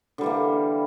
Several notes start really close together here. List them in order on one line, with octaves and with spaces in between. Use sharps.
D3 G3 E3 A#3